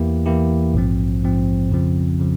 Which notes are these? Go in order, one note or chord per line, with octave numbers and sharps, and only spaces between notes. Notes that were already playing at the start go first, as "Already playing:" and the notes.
Already playing: E2 E3 A#3 E4 G4
E2 E3 A#3 E4 G4
A#1 G#2 F3 C4
A#1 G#2 F3 C4
F2 C#3 F3 C4
C#3 F3